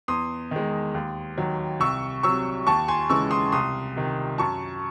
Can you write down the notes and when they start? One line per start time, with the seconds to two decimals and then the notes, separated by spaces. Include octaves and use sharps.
0.08 E2 C6 D#6
0.51 D#3 G#3
0.94 D#2
1.38 D#3 F#3
1.80 C2 C#6 E6
2.23 C3 F#3 C#6 E6
2.66 D#2 A5 C#6
2.88 G#5 C6
3.09 C#3 E3 G#3 C#6 E6
3.31 C6 D#6
3.52 C2 C6 D#6
3.96 C3 D#3
4.38 F#2 A5 C#6